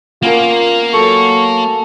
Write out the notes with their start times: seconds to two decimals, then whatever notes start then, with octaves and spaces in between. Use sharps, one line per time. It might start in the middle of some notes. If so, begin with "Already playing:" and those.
0.22 A#3 B3 C#4 F4 A#4
0.93 F#3 A4 C#6